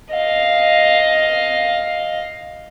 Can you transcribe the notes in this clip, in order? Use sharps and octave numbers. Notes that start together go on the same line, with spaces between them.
D#5 F5